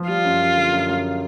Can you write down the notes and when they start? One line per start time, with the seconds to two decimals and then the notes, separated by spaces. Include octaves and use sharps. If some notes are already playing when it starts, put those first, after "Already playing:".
Already playing: F3
0.09 G3 F4
0.25 F#2
0.40 F#2
0.56 D3
0.72 F#2
0.89 F#2